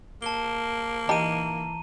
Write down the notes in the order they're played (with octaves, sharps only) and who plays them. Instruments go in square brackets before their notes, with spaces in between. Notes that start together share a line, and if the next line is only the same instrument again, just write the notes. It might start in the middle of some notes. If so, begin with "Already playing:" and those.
[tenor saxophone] A#3 [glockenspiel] A5 G7
[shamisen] D#3 G4 A5 [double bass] E3 [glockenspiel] A#5 D#7